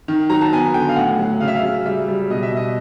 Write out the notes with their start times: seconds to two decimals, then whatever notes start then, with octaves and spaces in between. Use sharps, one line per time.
0.08 D#3
0.29 F#3 A#5
0.41 A5
0.52 B3 G#5
0.74 D3 G5
0.89 F5
0.96 A2 F#5
1.19 F#3
1.40 C#3 F5
1.48 E5
1.55 F5
1.63 F#3
1.86 G3 E5
2.08 G3
2.30 B2 D#5
2.43 E5
2.52 B2 D#5